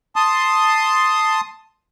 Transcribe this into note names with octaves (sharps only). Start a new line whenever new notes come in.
A5 C6 D#6